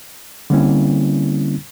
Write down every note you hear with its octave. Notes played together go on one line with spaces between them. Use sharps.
D3 G3 A#3 C4 C#4 E4